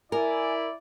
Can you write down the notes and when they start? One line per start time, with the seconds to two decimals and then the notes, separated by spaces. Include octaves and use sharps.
0.12 E4 A#4 D5 G#5